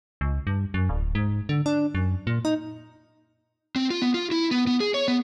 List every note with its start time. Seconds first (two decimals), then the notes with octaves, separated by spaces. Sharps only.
0.21 C#2
0.47 G2
0.74 F#2
0.89 D1
1.15 G#2
1.49 D3
1.66 D4
1.95 F#2
2.27 A#2
2.45 D#4
3.76 C4
3.90 F4
4.02 B3
4.14 F4
4.31 E4
4.51 B3
4.67 B3
4.80 G#4
4.94 C#5
5.08 B3